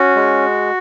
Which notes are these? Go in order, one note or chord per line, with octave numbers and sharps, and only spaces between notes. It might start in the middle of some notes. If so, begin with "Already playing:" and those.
Already playing: C#4 F#4
G#3